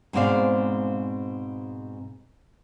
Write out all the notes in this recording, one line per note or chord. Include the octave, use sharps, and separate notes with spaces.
G#2 B2 G#3 C4 D5 F5